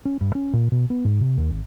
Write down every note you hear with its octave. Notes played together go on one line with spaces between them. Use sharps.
C#4
G2
C#4
A#2
B2
B3
G#2
C3
D#2
G#1